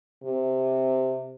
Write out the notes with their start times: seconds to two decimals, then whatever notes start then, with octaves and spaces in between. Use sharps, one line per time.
0.23 C3